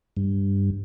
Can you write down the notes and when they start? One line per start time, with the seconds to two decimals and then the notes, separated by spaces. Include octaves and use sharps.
0.17 G2